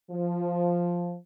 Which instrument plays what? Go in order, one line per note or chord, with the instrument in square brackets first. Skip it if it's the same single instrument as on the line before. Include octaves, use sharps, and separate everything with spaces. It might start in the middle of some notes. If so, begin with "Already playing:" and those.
[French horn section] F3